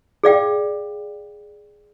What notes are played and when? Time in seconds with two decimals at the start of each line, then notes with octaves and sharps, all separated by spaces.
0.23 G#4 D5 F5 G5